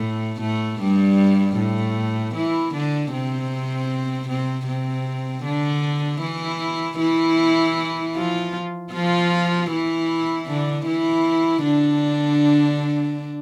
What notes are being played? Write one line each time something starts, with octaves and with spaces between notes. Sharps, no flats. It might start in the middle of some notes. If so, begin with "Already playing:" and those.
Already playing: A2 A3
A2 A3
G2 G3
A2 A3
E3 E4
D3 D4
C3 C4
C3 C4
C3 C4
D3 D4
E3 E4
E3 E4
F3 F4
F3 F4
E3 E4
D3 D4
E3 E4
D3 D4